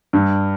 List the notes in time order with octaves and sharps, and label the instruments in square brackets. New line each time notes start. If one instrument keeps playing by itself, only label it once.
[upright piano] G2